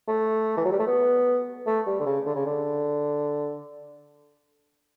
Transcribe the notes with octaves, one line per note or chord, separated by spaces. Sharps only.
A3
E3
F#3
G3
A3
B3
A3
G3
D3
C#3
D3
C#3
D3